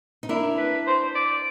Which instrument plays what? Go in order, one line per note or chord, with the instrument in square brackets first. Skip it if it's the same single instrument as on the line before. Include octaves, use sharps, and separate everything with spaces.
[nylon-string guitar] D#4
[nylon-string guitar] D4 E4 [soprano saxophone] A#4
[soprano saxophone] B4
C5
D5